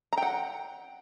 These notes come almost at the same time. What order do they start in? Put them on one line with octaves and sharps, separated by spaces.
A#5 G5 F#5